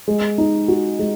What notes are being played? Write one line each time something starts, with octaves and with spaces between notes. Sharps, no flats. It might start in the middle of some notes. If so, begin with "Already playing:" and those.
G#3
D#4
F#4
G#3